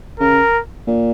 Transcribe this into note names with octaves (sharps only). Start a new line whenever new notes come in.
C#3 A#4
A#2